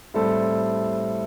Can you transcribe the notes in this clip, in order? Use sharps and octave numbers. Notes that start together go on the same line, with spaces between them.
A2 G3 C4 A4